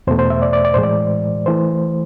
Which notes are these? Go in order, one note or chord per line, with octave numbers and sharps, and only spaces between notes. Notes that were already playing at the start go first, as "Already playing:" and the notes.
E2 B2 A3 C5
C5
E5
D5
D5
D5
A2 E3 G#3 C5
D5
E3 A3 C5